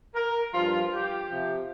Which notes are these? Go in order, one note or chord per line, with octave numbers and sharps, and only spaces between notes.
A#4
G2 F3 F4
G4
C3 F3